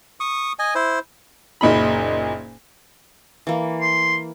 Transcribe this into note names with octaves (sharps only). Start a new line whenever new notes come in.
C#6 D#6
D#5 G#5
E4 C5
F#1 A#2 D#4 B5
E3 A#3
C6